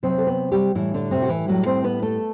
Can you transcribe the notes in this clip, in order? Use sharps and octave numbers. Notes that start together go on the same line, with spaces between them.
C3 F#3 C4 C5
A4
B3 B4
G3 G4
A2 E3 G3 E4
D3 D4
C3 C4
F#4
E3 E4
A2 F#3 G3 F#4
C4 C5
B3 B4
A3 A4